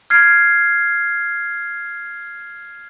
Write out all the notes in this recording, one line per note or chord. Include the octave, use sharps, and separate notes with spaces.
F6 G#6 C7